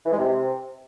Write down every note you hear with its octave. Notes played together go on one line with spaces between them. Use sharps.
E3
G#3
C3